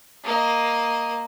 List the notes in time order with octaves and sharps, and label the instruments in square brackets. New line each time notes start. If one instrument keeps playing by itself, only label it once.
[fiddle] A#3 D#5